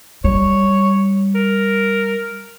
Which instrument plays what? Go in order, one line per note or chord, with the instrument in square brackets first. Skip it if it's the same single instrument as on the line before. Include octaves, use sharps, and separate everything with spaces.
[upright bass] G3 [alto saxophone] C#5
[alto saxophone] A#4